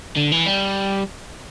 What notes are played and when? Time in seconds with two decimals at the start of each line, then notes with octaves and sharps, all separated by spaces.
0.16 D3
0.32 E3
0.46 G3